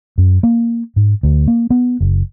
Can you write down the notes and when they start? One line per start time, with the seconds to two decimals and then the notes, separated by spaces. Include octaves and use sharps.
0.18 F#2
0.43 A#3
0.96 G#2
1.23 D2
1.48 A#3
1.70 B3
2.01 F#1